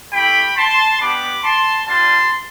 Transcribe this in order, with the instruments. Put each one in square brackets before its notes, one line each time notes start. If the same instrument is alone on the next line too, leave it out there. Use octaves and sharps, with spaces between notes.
[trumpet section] A3 E4 G4 G5 B5
A5 C6
B3 D4 G4 B5 D6
A5 C6
G3 D4 F4 A5 C6